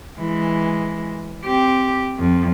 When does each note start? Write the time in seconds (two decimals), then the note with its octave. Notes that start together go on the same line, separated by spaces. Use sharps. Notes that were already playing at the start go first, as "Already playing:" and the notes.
0.19 E3 G#3
1.44 C4 G4
2.19 F2